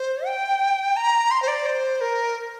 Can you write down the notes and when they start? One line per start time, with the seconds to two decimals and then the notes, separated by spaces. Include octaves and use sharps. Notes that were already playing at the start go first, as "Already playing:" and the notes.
Already playing: C5
0.26 G5
0.96 A#5
1.31 C6
1.42 C5
1.48 D5
1.66 C5
2.01 A#4